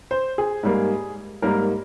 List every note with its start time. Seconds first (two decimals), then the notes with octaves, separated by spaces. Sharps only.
0.11 C5
0.38 G#4
0.63 G#2 G3 A#3
1.42 G#2 G3 A#3 A#4